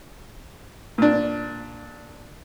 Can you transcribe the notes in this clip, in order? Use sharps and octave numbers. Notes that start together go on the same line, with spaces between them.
A#2 D4